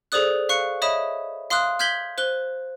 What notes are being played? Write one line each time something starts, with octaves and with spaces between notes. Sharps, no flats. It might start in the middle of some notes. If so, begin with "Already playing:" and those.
G#4 A4 C5 D5 D#6 F#6
F5 C#6 F#6 C#7
C#5 D#5 E5 B5 D#6 E7
F5 C6 D#6 F6 F#6
F6 G6 G#6 B6 F#7 G7
C5 F#6 G7